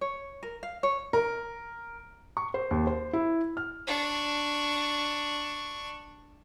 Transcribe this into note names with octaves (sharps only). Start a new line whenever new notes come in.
C#5
A#4
F5
C#5
A#4
C#6
C5
D#2
C5
E4
F6
D4 C#6